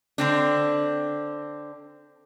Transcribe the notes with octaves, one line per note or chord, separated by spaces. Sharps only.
D3 C4 D4